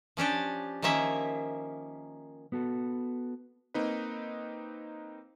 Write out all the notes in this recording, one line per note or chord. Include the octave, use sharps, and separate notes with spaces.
F3 C#4 D4 G4
D#3 F3 A#3 C#4 E5
B3 F#4 A4
A#3 C4 D#4 B4